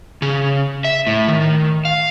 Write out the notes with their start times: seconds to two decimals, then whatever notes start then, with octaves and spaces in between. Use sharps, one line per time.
0.22 C#3
0.84 E5
1.07 A2
1.28 D#3
1.85 F5